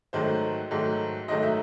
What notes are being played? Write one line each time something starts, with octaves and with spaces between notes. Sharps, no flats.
G#2 D#3 F#3 A3 C5
G#2 D#3 F#3 A3
G#2 D#3 F#3 A3 D#5
E5